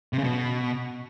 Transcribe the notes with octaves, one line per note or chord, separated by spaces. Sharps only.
C3
C#3
B2